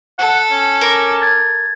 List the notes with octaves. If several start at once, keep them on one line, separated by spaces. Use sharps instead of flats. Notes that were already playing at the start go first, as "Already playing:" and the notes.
A4 F#5
C#4
A#4 D6
G#6 A6